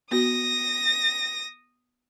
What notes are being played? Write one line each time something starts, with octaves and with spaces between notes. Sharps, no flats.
B3 F#4 D#6 A#6